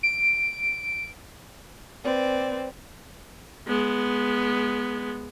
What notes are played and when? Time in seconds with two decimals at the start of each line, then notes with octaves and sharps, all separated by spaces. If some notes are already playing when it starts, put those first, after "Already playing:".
0.03 D7
2.04 C4 B4 D5
3.67 G#3 B3